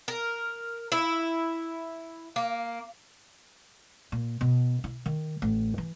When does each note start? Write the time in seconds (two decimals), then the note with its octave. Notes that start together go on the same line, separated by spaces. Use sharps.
0.08 A#4
0.92 E4
2.36 A#3
4.12 A#2
4.41 B2
4.84 E4
5.06 D#3
5.42 A1
5.78 E3